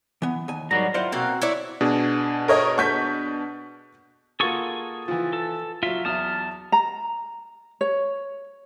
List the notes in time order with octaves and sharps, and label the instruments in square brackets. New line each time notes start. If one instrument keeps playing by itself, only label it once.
[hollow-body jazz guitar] E3 B3
D#2 G#5
[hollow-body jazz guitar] G#2 G3 [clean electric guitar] F#3 F#4 A#5 [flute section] D#4 A#4 D5
[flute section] E4 [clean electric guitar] F4 [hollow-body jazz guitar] C5 D5 F#5
[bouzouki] B2 A#3 F5 [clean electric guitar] C4 [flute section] F#4 E6 F#6
[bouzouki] E4 C#5 D5
[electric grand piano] B2 D4 G#4
[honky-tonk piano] A#4 C#5 D#5
C#6 G6 B6
[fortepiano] A#3 F4 F#4 [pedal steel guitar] G#4 A4 C#6
[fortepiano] E3 F3
[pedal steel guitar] A4
[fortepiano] F#3 F5 [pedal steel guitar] F4 E5
[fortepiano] E2 F#3 E5 [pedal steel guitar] A5 D#6 F6
[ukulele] A#5
C#5